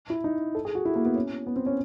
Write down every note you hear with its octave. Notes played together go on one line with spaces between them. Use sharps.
E4
D#4
A4
G#4
F#4
E4
A#3
B3
C#4
B3
C4
C#4